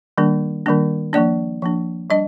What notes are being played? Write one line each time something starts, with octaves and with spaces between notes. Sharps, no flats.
D#3 G3 A#3 D4
D#3 G3 A#3 D4
F3 A#3 D4 D5
F3 A#3 D4
G3 D4 D#5